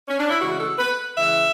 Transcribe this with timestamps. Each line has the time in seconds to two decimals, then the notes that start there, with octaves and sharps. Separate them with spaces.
0.08 C#4
0.18 D4
0.29 E4
0.39 C#3 E3 G#3 F#4
0.58 A4
0.76 B4
1.15 C#3 E3 G#3 E5